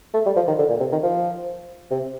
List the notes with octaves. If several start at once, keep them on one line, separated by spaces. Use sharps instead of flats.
A3
G3
F3
D#3
D3
A#2
C3
D#3
F3
C3